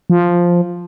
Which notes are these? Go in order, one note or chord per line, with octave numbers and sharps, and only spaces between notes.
F3